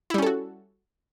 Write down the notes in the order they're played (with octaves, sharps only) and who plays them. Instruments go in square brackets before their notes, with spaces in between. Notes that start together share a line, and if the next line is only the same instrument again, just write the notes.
[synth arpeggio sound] E4
G3
C#4
A4
F#4